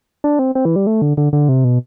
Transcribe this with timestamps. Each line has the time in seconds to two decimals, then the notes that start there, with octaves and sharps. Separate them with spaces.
0.24 D4
0.39 C4
0.55 C4
0.65 E3
0.76 G3
0.87 A3
1.02 D3
1.17 D3
1.33 D3
1.49 C3
1.64 B2